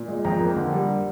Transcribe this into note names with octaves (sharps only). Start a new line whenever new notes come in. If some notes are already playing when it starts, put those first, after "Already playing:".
Already playing: A#2
G#3
F2 G5 A#5
A#3
D3
G3